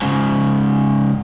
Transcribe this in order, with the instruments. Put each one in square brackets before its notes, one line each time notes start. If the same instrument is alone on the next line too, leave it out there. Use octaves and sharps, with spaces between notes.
[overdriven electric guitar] G#2 C#3